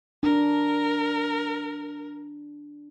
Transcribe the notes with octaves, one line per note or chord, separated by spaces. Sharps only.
D4 A#4